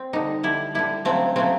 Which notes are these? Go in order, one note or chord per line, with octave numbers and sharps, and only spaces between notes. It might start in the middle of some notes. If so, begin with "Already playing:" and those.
Already playing: C4
D3 G3 D#4
D3 G3 E4
D3 G3 E4
C#3 F#3 A3 C4
C#3 F#3 A3 C4